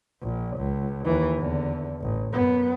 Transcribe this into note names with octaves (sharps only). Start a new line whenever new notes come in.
A#1
C#2
D#2 E3
E2 D3
A1
F#2 B3